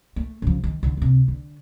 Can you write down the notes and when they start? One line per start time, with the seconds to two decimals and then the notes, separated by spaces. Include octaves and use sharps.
0.16 A3
0.42 C#3 F3
0.64 D#3
0.83 D3 E3
0.97 D2 C3
1.28 D3